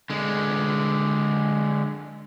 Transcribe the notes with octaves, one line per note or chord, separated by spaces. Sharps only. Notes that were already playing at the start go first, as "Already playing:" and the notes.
D3 G#3